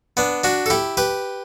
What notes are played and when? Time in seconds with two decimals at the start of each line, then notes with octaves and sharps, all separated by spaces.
0.17 B3 D4
0.44 D4 F#4
0.66 A4
0.70 E4 G4
0.97 G4 B4